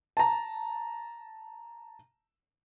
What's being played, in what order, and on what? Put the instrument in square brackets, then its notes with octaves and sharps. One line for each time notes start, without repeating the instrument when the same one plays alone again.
[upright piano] A5 A#5